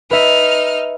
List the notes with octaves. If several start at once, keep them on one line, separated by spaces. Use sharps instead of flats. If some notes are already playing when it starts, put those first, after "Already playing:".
D#4 B4 E5 F6